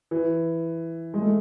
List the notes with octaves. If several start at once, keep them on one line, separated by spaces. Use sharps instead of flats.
E3
G#3
A3